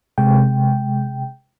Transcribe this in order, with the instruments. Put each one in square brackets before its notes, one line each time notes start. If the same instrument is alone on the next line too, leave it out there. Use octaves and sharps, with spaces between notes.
[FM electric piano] C3 G#3 G5